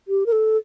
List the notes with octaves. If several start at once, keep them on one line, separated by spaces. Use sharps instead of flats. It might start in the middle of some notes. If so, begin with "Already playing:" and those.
G4
A#4
A4